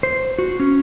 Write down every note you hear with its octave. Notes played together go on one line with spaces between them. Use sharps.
C5
F#4
C#4